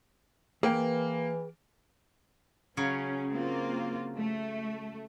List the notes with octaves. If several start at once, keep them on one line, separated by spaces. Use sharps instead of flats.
E3 A#3 G#4 B4 G5
C#3 F#3 C#4 C#5
A#3 C4 F4
A3